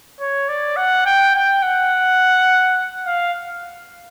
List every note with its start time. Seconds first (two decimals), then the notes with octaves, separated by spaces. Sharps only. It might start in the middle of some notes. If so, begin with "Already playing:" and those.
0.20 C#5
0.49 D5
0.77 F#5
1.05 G5
1.35 G5
1.62 F#5
3.06 F5